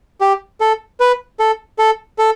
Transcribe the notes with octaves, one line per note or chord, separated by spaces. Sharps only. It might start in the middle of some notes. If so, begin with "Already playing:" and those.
G4
A4
B4
A4
A4
A4